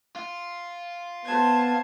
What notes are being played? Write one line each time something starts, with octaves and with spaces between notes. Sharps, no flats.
F4
B3 C5 A5 G#6